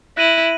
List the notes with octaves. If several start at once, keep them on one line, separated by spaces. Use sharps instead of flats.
E4 F#6 A#6 D#7 F#7